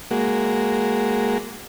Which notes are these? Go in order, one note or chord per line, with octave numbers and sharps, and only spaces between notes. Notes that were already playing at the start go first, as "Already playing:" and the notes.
G#3 A#3 F#4